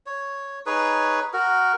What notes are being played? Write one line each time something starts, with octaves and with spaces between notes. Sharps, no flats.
C#5
D#4 G#4 B4 C#5
F#4 A#4